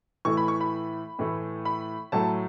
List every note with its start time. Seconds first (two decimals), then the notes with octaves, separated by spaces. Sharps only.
0.25 A2 E3 A3 C#6
0.37 B5
0.48 C#6
0.61 B5
1.19 A2 E3 A3
1.65 B5
2.12 A2 F#3 A3 A5